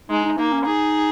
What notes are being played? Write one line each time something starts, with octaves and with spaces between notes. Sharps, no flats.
G#3 D#4
D#4
A#3 D#4
C#4
D#4 G#4